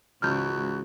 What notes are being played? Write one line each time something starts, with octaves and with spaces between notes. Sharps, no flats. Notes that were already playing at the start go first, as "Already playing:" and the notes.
C#2 G#2 C#3 E3 F#4 F6 G6